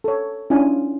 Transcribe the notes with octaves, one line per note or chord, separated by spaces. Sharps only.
A4 C#5
C#4 D4 E4 F4 G#5